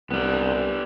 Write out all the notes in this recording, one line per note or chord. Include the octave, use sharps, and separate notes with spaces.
C2 G3 B3